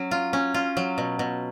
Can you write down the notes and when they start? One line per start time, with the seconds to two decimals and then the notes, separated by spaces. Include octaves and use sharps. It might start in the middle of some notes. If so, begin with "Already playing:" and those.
Already playing: F#3 C#4
0.11 F4
0.33 C#4
0.54 F4
0.77 F#3
0.98 B2
1.19 B2